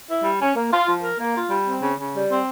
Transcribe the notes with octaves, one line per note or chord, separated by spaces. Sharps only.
E4
G3
C#4
A#3
F4
F3
A#4
A#3
F4
G3
C4
C#3
C#3
G3
C4